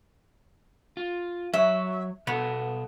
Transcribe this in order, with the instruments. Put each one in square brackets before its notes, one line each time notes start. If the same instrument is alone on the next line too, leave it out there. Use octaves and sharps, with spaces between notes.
[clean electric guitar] F4
[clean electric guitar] F#3 C#5 [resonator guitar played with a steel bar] E5
[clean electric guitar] B2 A4 [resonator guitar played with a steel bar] B3